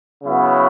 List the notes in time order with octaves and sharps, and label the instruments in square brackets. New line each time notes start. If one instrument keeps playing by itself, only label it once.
[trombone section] C#3 F#3 B3 E4